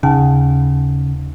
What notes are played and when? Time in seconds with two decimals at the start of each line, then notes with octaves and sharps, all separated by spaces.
0.03 D#2 C#3 F#5 A5